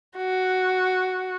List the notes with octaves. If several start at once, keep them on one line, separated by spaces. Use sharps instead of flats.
F#4